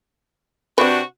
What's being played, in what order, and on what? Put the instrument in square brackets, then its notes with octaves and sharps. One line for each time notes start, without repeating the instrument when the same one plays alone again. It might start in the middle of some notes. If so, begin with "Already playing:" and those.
[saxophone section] C3 D4 F#4 [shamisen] C4 B4